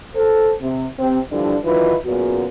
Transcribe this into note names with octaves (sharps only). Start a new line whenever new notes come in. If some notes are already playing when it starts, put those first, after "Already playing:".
A4 C5
C3
C3 C4
G2 D3 E3 F3 G3 D4
D#3 E3 F#3 D#4 F4 B4
F#2 A#2 C#3 B3 F#4